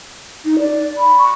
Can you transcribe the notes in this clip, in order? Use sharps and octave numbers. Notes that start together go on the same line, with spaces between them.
D#4
D5
B5
C#6